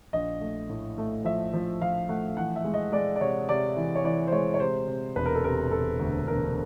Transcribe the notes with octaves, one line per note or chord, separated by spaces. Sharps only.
A#1 D#5
A3
A2
A3
F3 E5
F3
F3 F5
A3 F#5
E3 F#5
E5
G#3
D#5
G#3 D5
D5
C3 C#5
C3 D5
E3
C#5
E3 D5
C5
G#3 C#5
C#5
C3 C5
C3
E1 B4
A#4
A4
C3 A#4
E1 A4
D2
E1 A#4